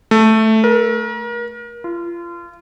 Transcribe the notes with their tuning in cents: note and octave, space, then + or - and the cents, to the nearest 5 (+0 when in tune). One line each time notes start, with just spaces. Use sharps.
A3 +0
A#4 +35
F4 -30